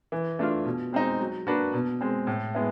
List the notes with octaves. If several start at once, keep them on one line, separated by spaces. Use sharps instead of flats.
E3
A3 D4 F4
B2
G#3 C4 D#4
F#3
A#3 D4 F#4 B4
B2
G#3 C4
A2
G#3 B3 E4